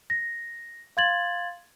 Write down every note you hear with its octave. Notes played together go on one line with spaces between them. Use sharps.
A#6
F5 C6 G#6 A6 F#7